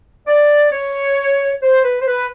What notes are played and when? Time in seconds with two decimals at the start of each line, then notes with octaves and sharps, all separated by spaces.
0.27 D5
0.72 C#5
1.62 C5
1.83 B4
2.01 C5
2.06 B4